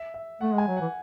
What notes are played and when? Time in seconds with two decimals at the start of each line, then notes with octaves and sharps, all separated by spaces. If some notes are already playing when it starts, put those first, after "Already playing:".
Already playing: E5
0.14 E5
0.41 A3 F#5
0.54 G#3
0.58 G#5
0.68 F#3
0.77 E3 F#5